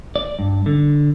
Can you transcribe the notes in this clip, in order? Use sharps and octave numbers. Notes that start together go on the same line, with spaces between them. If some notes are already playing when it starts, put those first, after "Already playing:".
D5
G2
D3